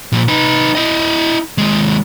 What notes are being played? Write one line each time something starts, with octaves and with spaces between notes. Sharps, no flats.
A#2 F3
D#4 B4
E4 D#5
D#2 G#3